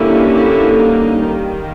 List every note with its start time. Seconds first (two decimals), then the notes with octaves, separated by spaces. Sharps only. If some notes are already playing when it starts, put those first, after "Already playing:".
Already playing: D3 G3 A#3 C#4 E4
0.34 E4
0.77 D#4
1.19 D#3 G3 A#3